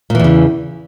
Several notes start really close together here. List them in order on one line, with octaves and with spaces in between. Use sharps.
A#2 E3 E2 C#3